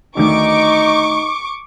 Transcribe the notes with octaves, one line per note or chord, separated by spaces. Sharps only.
D2 D#3 D#4 C#6 D6